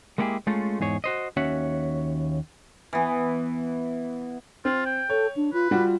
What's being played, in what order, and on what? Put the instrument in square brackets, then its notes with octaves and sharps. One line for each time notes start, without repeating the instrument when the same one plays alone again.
[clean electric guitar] G#3 A#3 B3 E4 G4 G#4
G#3 A3 C#4 F4 A4
E2 G#2 G#4 C#5
F#4 C5 D#5
D#2 C#4 F#4 C#5 E5 F#5
[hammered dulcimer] E3 B3
[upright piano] C4 [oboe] F4
[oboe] G5
[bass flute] A4 [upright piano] C#5
[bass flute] D4
[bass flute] F4 [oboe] B4
[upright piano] G3 F#4 [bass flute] F4